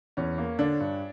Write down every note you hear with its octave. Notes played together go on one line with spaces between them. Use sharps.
E2 C#4
A#3
D3 D4
G2